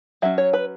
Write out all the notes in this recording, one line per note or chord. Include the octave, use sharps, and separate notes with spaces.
F#3 C#4 E5
C#5
B4